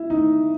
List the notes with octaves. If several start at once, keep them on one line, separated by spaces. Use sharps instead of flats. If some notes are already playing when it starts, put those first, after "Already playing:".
Already playing: E4
D#4